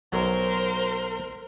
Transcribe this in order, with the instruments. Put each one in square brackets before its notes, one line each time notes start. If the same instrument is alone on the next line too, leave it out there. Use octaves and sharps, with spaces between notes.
[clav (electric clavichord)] B1 F#3 [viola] A#4 C5